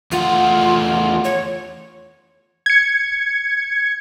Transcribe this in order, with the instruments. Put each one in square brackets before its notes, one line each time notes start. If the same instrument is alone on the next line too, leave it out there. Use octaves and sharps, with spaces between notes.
[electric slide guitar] E2 A3 F#5 [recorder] F4
[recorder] C#5
[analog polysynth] G#6 C#7